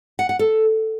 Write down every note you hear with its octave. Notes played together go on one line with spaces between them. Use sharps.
F#5
F#5
A4